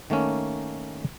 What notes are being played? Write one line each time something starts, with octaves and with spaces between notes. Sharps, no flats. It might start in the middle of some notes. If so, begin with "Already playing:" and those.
D#3 A3 A#3 C#4